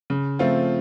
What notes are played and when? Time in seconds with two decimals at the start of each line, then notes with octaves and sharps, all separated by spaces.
0.10 C#3
0.39 F3 A3 C4 F4